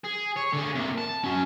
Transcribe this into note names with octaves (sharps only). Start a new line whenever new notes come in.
G#4
C#5
D3 G#4
C3 A#3
A5
C#4 F#4